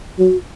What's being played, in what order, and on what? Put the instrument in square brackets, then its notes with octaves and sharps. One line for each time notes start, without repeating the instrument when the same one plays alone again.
[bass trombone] F#3 [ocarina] F#4